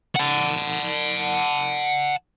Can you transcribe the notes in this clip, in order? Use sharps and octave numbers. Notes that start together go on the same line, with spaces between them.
F#5 A5